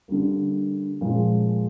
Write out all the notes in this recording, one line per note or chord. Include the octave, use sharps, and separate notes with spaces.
D3 G3 A#3
A#2 F3 G#3